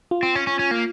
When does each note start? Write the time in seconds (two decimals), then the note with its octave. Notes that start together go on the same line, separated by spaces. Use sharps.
0.11 F4
0.23 C4
0.35 C#4
0.47 C#4
0.59 C#4
0.71 A#3